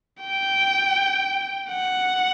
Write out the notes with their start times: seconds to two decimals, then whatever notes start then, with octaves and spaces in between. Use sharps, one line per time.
0.21 G5
1.69 F#5